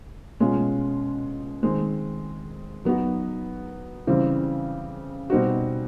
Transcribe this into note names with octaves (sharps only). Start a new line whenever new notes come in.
B2 G#3 C#4 F4
D#3 G#3 C4
F#3 B3 D#4 F#4
C#3 E3 G3 C4
B2 G3 C4 D#4 F#4